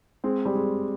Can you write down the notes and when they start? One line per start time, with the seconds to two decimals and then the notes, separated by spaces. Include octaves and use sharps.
0.24 G#3 C4
0.45 G3
0.55 G#3